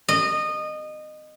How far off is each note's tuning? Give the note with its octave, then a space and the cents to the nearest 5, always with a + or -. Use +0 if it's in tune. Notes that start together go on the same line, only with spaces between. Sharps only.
D#5 -20